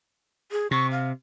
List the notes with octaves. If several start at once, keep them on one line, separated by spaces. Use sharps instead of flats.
G#4
C3 C#6
F5